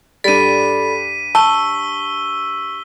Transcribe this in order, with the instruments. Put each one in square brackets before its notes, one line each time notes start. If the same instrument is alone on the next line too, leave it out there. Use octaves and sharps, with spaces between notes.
[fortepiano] G2 G3 [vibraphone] A4 D5 B5 [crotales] B6 D#7
[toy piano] A5 [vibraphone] C#6 [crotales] E6 G7